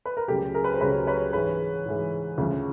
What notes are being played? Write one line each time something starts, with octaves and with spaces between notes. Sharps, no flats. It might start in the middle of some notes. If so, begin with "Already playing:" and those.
B4
A#4
C#2 C#3 F#3 A3 G4 A4
G#4 A#4
B4
C5
C#2 C#3 F#3 A3 B4 C#5
B4 C#5
G#2 E3 G#3 B4 C#5
G#2 E3 G#3
D2 C#3 F3